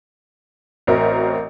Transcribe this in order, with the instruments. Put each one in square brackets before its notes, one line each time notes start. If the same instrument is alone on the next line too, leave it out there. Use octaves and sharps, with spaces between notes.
[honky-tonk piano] A1 C4 F#4 A#4 E5